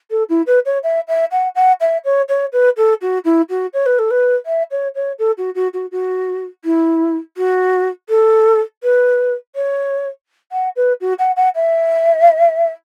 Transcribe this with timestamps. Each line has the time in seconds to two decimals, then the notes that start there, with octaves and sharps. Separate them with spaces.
0.11 A4
0.29 E4
0.47 B4
0.66 C#5
0.83 E5
1.08 E5
1.31 F#5
1.55 F#5
1.81 E5
2.05 C#5
2.29 C#5
2.53 B4
2.77 A4
3.02 F#4
3.25 E4
3.50 F#4
3.74 C#5
3.86 B4
3.99 A4
4.11 B4
4.46 E5
4.71 C#5
4.95 C#5
5.19 A4
5.38 F#4
5.55 F#4
5.74 F#4
5.92 F#4
6.65 E4
7.37 F#4
8.09 A4
8.83 B4
9.56 C#5
10.52 F#5
10.76 B4
11.01 F#4
11.19 F#5
11.36 F#5
11.55 E5